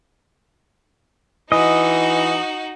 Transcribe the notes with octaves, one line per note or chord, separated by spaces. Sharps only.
E3 D#4 F#4 D#5